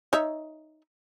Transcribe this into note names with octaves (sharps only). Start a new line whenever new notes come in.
D#4 C#5 E5